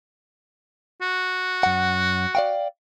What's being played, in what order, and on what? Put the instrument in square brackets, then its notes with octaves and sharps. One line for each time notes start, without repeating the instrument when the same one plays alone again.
[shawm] F#4
[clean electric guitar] F#2 F#5
D5 F5 G5